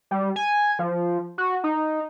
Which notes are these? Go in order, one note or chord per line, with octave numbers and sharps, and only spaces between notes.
G3
G#5
F3
F#4
D#4